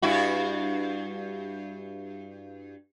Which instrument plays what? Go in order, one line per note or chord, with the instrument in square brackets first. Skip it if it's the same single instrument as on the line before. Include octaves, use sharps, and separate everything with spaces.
[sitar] G2 E4 F#4